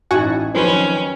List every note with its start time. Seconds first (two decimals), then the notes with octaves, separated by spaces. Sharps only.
0.11 A1 G#2 E4 F#4 G#5 A5
0.55 F2 D#3 F#3 C#4 B4 C5